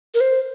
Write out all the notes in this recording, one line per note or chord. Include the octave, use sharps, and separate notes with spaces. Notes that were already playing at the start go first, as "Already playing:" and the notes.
A#4
C5